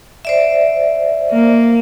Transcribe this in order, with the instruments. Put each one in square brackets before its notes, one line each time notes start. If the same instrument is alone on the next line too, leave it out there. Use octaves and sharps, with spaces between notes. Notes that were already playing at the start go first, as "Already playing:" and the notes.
[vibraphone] C5 D5 E5
[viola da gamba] A#3